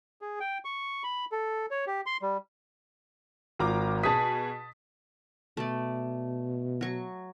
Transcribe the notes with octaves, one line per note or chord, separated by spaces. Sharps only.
G#4
G5
C#6
B5
A4
C#5
G4
C6
G3
G#1 F4 A#5 D6
B2 G#4 A5 D#6 B6
B2 A3 D5
F#3 C#6